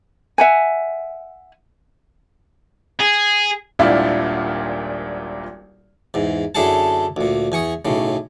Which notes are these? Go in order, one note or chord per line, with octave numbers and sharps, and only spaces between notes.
E5 F#5 G#5
G#4
D#1 G#1 A#2 D4 E4 F4
E2 G#2
F#2 D3 E4 G#4 A4 A5
D2 A#2
E2 G#5 C#6 D#6
B1 A2 C#3